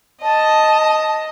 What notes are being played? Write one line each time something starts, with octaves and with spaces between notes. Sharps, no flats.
D#5 A5